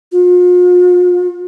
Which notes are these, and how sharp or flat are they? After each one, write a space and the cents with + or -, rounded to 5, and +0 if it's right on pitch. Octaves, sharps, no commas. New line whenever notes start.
F4 +40